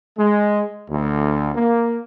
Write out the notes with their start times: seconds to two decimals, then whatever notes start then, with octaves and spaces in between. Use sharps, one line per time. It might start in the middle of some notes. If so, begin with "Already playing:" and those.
0.18 G#3
0.90 D2
1.55 A#3